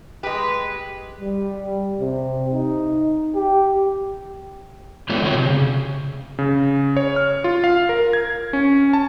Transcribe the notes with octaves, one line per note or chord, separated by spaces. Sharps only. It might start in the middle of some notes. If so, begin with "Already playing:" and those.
G#3 G4 B4
G3
C3
D#4
G4
G#3 A3 B3 D4 F4 C#5
D3 C4 F#4 C#5
C3
C#3
C#3
C#5
F6
F4
F5
A#4
G#6
C#4
A5